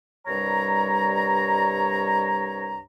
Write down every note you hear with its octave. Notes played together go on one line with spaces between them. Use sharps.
C2 G2 G3 C#5 A#5